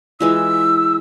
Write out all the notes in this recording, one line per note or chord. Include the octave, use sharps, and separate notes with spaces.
E3 G#3 F4 E6